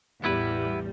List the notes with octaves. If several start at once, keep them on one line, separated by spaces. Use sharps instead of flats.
A1 E2 G3 B3 E4 B4